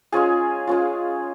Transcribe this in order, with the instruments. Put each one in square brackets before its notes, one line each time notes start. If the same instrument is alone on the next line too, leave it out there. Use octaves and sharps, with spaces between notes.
[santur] G#3 C#4 F4 G#4 G#5
G#3 C#4 F4